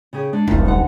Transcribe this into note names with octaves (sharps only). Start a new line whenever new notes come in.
C#3 G4 G#4
G#3 D4 D#4
D#1 B1 D#3 A3 F4
D3 D#5 F#5